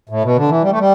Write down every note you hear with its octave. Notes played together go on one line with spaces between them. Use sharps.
A2
B2
D3
E3
G3
A3
G3